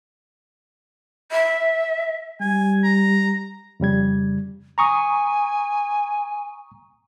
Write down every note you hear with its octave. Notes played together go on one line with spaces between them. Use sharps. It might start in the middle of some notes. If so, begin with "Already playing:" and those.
E5
G3 G#5
A#5
F2 C#3 G3 G#6
G#5 A#5 C#6 D#6